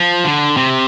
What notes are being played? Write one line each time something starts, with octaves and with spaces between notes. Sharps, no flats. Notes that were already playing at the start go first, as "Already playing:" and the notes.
Already playing: F3
D3
C3